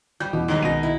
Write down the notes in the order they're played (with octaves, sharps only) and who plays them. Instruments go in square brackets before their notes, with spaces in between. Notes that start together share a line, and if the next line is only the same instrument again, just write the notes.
[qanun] G3 [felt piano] G6
[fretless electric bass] E2 E3 [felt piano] B2 [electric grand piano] G4
[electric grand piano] G#2 F#3 G3 [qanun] D#3 G#4
[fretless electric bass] C2 C4 [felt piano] B2 D#7 [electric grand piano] G#3 A#6
[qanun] E4